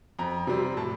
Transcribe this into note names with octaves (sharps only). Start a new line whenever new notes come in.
F2 A#5
C3 G3 C4
A2 A5